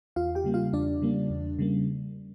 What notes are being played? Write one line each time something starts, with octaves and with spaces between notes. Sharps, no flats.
E2 F4 F5
G4 G5
C#3 G3 A#3
F4 F5
E2 D4 D5
C#3 G3 A#3
E2
C#3 G3 A#3